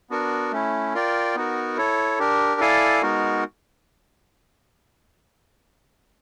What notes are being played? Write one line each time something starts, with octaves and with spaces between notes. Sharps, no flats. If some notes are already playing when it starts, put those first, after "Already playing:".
B3 D4 F#4 A#4
A3 C#4 E4
F4 A#4 D5 G5
B3 D#4 F#4 A#4
E4 A4 C#5
D4 G4 A#4
E4 A4 D5 F5 G#5
G#3 B3 D#4 F#4 A#4